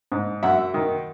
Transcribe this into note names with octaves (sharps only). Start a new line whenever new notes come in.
G#2
F#2 E5 F#5
D#3